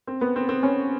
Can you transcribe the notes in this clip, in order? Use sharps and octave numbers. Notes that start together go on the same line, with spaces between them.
C4
B3
C4
C4
C#4